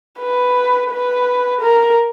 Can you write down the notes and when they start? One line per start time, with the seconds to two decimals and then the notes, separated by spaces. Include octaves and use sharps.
0.19 B4
0.90 B4
1.61 A#4